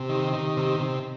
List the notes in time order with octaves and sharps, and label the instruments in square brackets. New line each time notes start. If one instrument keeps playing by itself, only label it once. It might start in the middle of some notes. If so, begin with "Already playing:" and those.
Already playing: [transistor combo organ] C3 [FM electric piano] G4
[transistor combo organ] D#3
D#3
C3
C3